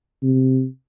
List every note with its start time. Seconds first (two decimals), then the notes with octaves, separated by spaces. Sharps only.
0.23 C3